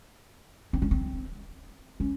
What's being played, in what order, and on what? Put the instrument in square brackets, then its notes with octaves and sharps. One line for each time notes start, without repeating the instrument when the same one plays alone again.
[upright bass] C4
C#4
C4
C#4